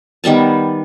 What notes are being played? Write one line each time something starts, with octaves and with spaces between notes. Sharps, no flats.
D#3 G3 B3 A5